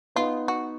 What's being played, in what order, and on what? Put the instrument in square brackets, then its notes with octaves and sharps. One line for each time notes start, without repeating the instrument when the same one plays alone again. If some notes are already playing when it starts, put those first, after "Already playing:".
[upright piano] B3 D#4 [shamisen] F4
[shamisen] F#4